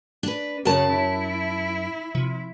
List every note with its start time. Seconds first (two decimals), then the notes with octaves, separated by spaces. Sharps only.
0.23 D4 B4
0.65 F#2 C#3 F#4 A#4 C#5 A5
0.96 E4
2.15 C3 F3